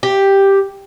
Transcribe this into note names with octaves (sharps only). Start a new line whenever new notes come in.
G4